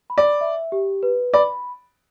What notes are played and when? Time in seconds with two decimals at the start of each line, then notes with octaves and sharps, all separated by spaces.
0.10 B5
0.18 D5
0.41 E5
0.72 G4
1.03 B4
1.34 D5 B5